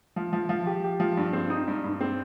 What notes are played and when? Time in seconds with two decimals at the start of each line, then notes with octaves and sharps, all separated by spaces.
0.16 F3
0.33 F3
0.49 F3
0.67 G4
0.84 G4
1.00 F3
1.17 G2
1.33 C4
1.50 D#4
1.68 G2
1.84 G2
2.01 C4